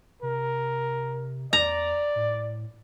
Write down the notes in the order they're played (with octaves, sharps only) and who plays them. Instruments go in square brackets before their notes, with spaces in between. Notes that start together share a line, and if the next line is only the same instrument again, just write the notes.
[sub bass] C3 [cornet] A#4
[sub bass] E2 [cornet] D5 [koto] A#5
[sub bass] A2